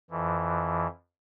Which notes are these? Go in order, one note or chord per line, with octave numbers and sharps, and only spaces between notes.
F2 E3